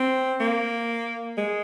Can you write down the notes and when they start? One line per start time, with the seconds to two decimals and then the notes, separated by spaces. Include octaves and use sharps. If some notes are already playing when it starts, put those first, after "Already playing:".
Already playing: C4
0.40 A#3
1.38 G#3